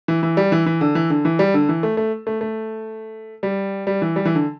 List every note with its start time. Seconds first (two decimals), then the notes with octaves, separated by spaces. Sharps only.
0.08 E3
0.23 E3
0.37 G3
0.52 E3
0.66 E3
0.81 D3
0.95 E3
1.10 D3
1.25 E3
1.39 G3
1.54 D3
1.69 E3
1.83 A3
1.97 A3
2.27 A3
2.41 A3
3.43 G3
3.87 G3
4.02 E3
4.16 G3
4.25 E3
4.35 D3